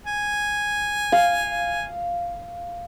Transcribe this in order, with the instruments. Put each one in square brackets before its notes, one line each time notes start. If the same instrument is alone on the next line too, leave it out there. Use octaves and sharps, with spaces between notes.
[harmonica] G#5
[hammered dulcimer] F5